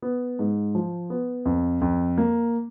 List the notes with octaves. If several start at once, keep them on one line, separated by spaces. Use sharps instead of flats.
B3
G#2
F3
B3
F2
F2
A#3